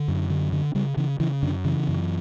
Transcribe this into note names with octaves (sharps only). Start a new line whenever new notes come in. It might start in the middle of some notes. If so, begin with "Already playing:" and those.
Already playing: D3
F#2
D3
D3
C#3 G3
C#3 E3
C#3 E3
F#2 D3
C#3 E3
F#2